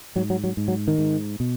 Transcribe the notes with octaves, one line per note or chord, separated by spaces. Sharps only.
G#2 F#3
F#3
F#3
G#2
F#3
D#3
G#2
B2